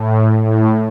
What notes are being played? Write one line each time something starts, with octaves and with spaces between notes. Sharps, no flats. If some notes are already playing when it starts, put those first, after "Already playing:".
Already playing: A2
A2